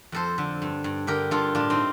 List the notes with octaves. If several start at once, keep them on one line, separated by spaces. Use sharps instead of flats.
F2 A4 C5
D3
G2
G2
D3 G4 A#4
G2 F4 A4
A2 D4 F4
C4 D#4